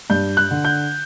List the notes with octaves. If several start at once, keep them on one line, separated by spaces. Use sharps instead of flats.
G2 G6
F#6
D3
G6